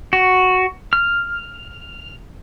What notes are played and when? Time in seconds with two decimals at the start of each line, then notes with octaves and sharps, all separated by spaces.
0.13 F#4
0.93 F6